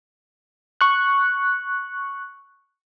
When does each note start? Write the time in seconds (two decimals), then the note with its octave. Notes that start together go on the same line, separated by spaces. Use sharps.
0.81 C#6 F#6